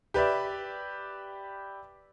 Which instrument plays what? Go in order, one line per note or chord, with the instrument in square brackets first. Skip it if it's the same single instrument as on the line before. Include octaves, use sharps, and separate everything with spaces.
[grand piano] G4 B4 D5 E5